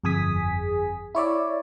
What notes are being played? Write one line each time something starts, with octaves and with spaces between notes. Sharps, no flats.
G1 F2 G#4 G#5 D#6 B6
E4 C#5 D5 E5